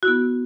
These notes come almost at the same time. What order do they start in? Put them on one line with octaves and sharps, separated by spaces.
F#4 E4 B3